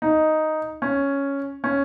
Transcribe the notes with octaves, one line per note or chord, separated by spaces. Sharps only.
D#4
C#4
C#4